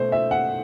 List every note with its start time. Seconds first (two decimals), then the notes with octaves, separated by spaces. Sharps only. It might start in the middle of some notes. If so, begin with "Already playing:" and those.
Already playing: B2 A3 C5
0.12 E5
0.31 F#5